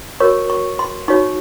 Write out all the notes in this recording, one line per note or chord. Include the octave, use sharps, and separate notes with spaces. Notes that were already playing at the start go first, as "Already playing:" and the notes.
F#4 A#4 C#5 C#6
C#6
C6
D#4 F#4 C#5 C#6